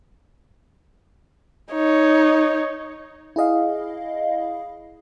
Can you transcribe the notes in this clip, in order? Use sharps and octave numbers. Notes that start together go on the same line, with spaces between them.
D#4 C#5
E4 G#4 D#5 F5